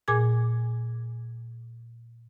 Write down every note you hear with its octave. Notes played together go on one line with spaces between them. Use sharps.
A#2 G#4 G#5 D6 G#6